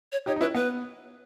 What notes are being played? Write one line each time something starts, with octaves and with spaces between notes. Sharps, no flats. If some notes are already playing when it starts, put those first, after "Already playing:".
C#5
D#4 G4 C#5
D#4
C#4 E4 B4
B3 B4